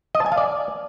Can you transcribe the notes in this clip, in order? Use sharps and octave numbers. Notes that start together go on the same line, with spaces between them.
D#5
A5
G#5
F5
D5